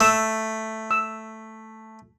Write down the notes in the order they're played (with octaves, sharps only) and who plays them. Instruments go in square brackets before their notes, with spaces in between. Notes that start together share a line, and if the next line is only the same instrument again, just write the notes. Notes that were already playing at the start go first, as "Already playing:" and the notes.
[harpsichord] A3 [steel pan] E6
[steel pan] E6